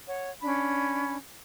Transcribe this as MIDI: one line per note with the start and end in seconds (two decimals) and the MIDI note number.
0.08 0.31 73
0.08 0.31 78
0.43 1.15 61
0.43 1.15 62
0.43 1.15 83